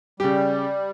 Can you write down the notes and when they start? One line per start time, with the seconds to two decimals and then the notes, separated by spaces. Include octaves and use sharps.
0.20 C#3 G3 G4